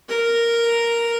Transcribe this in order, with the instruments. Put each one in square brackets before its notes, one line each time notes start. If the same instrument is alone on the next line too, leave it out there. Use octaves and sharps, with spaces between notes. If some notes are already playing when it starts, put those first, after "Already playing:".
[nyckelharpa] A#4